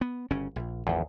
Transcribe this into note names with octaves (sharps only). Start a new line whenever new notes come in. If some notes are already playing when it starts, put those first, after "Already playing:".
B3
G1 C#3 C#4
A#1
G#1 E2 F3